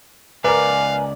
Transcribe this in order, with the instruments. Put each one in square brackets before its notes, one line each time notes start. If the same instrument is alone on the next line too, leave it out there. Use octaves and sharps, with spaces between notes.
[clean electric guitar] C#2 D5 [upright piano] A#4 B4 [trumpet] F5 [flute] G#5